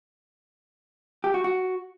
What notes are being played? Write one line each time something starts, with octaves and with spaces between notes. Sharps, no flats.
G4
F#4
F#4